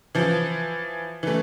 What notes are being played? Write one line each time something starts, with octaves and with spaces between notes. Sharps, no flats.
E3 F3
E3 A3